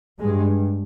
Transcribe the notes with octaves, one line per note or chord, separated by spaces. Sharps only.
G2 G#3